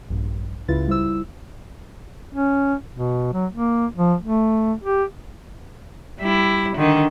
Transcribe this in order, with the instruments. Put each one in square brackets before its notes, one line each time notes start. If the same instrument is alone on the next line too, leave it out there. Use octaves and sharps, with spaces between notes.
[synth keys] A#1 G2
C#2 C#3 E4 F4 B4 A6
G3 E4 C5 E6
[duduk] C#4
B2
F#3
A#3
F3
A3
G4
[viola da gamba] G3 E4
D3 D#3